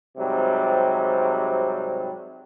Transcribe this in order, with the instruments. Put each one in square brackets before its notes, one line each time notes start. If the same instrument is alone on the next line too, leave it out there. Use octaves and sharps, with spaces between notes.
[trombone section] G#2 C3 F#3 G3